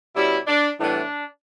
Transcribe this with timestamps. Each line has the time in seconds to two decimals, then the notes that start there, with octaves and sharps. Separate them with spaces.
0.16 B2 G3 C#4 E4
0.47 D4
0.79 A2 E3 G3 B3 D4